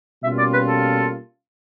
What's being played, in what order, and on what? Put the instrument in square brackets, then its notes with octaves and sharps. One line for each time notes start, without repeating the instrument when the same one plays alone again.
[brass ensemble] B2 G3 A#3 C#4 F4 [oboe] E5
[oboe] D5
B4
A4